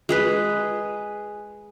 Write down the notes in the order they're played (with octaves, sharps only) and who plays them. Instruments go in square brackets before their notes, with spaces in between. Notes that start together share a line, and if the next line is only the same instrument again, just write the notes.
[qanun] G#3 G#4 B4